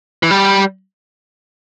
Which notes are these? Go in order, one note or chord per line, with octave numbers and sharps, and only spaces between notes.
E3
G3